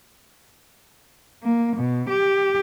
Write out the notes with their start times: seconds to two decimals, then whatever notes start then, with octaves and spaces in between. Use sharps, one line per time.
1.44 A#3
1.77 B2
2.09 G4